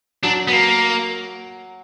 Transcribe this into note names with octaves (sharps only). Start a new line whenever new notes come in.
F#3 D4
B3
A#3